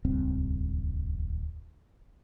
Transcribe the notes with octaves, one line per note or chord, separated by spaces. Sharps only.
D#1 C#2 G2 C4